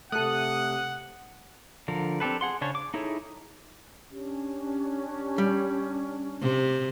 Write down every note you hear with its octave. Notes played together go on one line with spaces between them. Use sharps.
C3 A3 A4 F#5 D#6 F#6
D3 F3 A#4
C4 D4 G4 A4 B4
G#4 F#5 C6
C#3 C#4 D4 C5 C#5
D6
D#4 E4 G#4 A4 C#5
C#4 D4 G4
G3
C3